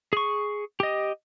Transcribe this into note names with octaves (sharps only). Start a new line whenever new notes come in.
G#4 C#6
G4 D#5